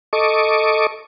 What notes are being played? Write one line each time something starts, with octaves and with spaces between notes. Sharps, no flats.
A4 D#5 C#6 D6